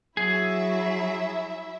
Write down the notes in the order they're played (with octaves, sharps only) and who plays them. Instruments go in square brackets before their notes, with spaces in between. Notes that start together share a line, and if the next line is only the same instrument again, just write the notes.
[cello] F#3 [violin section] E4 E5 [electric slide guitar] G#4